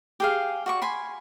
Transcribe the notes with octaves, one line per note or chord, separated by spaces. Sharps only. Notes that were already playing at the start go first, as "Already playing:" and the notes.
G4 G#4 F5
F#4 D5 C#6
G#5 B5 C6